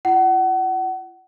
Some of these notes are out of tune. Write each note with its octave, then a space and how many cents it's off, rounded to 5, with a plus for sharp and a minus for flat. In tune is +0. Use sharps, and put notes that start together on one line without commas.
F4 -40 F#5 +30